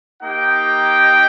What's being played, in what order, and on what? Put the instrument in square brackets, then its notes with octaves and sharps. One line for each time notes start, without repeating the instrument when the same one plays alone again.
[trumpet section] A#3 D#4 G4 G5